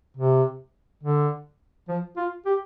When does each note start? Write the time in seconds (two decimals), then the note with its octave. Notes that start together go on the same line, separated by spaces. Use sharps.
0.17 C3
1.03 D3
1.88 F3
2.17 F4
2.46 G4